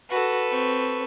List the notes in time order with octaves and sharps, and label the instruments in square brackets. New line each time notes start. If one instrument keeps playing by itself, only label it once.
[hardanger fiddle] F#4 [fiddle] A4 B4
[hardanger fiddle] C4 C#6